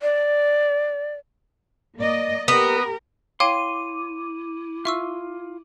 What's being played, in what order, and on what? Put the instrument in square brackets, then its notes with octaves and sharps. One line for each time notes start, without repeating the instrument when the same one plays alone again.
[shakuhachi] D5
[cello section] A#3 D5 D#5
[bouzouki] B3 [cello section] G4 A#4
[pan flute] E4 [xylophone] C#5 F5 G5 [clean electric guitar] C6 [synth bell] D6 D#7
[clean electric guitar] F4 [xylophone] E5 C#6 E6